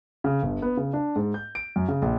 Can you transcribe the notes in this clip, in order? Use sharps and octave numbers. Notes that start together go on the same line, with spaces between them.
C#3
G1
B3
C#3
D4
G#2
G6
D7
F#2
C#3
A#1